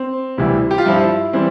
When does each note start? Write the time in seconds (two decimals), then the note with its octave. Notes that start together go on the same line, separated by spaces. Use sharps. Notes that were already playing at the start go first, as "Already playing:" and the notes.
Already playing: C4
0.37 D2 C3 E3 G3
0.71 G4
0.78 F4
0.85 G2 F3 E4
1.33 E3 G3 C4